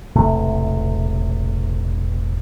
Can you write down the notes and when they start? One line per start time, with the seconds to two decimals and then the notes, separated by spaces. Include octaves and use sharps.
0.16 E1 A1 C3 A3